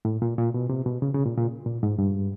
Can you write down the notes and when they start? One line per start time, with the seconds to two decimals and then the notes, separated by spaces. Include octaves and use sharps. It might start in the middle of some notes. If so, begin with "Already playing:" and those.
0.05 A2
0.22 A#2
0.38 A#2
0.54 B2
0.69 C3
0.86 B2
1.02 C#3
1.14 C#3
1.26 A#2
1.38 A#2
1.66 A#2
1.83 G#2
1.98 G2